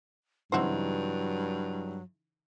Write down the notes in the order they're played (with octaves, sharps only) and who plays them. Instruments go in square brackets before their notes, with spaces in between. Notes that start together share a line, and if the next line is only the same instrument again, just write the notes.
[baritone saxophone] G2 [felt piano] C#3 E3 D#4 [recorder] F#3 [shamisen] C4 F#4 C5